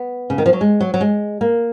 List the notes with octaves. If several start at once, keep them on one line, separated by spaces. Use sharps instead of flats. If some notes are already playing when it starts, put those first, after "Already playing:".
Already playing: B3
C#3
D#3
F3
F#3
G#3
F#3
F#3
G#3
A#3